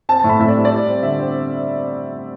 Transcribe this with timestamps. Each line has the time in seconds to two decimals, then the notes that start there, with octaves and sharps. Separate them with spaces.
0.09 C4 A5
0.19 A2 A5
0.29 B5
0.39 A2 E5
0.48 D5
0.56 G3
0.65 D5
0.72 G3
0.87 C4
1.03 D3 E5
1.19 C4